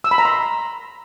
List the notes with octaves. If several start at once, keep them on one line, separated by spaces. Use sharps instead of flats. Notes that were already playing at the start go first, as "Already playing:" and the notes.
E6
B5
A#5
C6